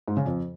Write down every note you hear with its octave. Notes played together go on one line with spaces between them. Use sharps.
G#2
C#3
F2